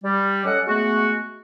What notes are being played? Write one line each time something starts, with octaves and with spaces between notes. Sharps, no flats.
G3
C#4 A4 D#5 F#5
G#3 A3 B3 F#4